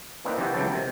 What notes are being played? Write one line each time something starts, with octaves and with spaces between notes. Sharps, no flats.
E3 A#3 C4 D4 D#4 B4
C3 E3 E4 F#4 G4
C#2 C#3 E3 F#3 G5 A5
C3 D#3